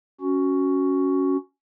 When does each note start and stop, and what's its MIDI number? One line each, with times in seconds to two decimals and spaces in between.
0.21 1.37 61
0.21 1.37 66